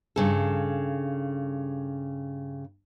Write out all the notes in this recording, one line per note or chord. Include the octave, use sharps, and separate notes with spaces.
G2 C#3 A4